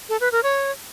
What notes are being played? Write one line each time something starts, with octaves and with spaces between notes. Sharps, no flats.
A4
B4
A#4
C#5